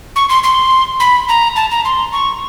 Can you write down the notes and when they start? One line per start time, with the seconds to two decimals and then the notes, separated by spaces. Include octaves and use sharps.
0.16 C#6
0.29 C6
0.44 C6
1.00 B5
1.28 A#5
1.56 A5
1.71 A#5
1.85 C6
2.12 C#6